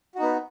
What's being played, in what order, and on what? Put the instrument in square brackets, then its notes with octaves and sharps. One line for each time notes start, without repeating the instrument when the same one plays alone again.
[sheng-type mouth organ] F#4
D#4
B3